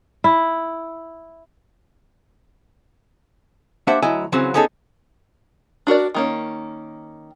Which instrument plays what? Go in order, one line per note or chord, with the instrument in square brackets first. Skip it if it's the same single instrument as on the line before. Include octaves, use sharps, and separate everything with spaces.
[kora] E4
[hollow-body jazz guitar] A#3 D4 G4 C5 E5 F#5
D2 F#3 E4 D#5 G#5
C#3 E3 F#3 C4 C#4 F#4
B3 C#4 D#4 G#4 A4
[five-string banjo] D4 F#4 A#4 D5
D#3 A#3 C#4